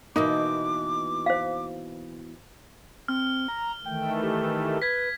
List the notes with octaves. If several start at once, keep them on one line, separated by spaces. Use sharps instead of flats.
B2 E3 A#3 D#4 D6
C5 F5
C4 F6
A#5
D#3 E3 A3 G5
G4
B4 G#6 B6